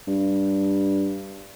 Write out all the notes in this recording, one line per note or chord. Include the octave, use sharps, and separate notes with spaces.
G2